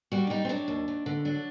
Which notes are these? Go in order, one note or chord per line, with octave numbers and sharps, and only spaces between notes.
G3 F#4
D4
G3 D#4
C4
F#3 D4
D#2
D#2
D3
F#3 D4